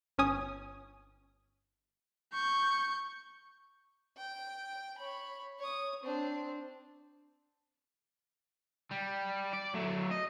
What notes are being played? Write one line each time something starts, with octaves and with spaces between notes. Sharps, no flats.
G1 C#4 G#5 D#6
C#6 G6
G5
C#5 B5
C#5 D#6
C4 D4
G3
D5
F#3 A3
D#5